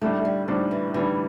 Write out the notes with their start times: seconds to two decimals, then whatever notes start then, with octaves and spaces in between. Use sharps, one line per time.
0.02 A2 G3 A3 D4
0.25 G3
0.48 A2 F3 G3 D4
0.71 E3
0.94 A2 E3 G3 D4